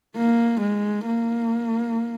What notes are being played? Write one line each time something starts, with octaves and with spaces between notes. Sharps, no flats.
A#3
G#3
A#3